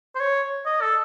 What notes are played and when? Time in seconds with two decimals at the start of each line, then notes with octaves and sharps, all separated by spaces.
0.15 C5
0.20 C#5
0.66 D#5
0.81 A4